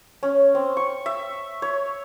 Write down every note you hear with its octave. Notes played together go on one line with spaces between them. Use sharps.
C#4
C4
C#6
E5
C#5